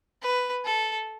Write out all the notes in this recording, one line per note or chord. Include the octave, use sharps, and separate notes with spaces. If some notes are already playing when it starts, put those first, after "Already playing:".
B4
A4